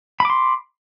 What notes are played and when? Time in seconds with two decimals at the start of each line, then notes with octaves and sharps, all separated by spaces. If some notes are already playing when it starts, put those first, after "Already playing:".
0.20 B5
0.25 D6
0.30 C6